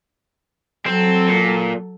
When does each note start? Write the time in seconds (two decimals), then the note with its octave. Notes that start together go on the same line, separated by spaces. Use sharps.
0.86 F#3 C4 A4
1.28 A#2